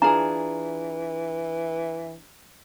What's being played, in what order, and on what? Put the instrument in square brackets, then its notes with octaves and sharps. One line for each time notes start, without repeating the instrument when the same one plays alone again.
[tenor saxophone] E3 [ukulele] D4 F4 G#4 [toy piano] A#5